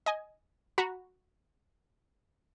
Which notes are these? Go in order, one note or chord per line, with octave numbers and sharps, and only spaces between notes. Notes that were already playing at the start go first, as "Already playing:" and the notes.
D#5 G#5
F#4 A#5 B5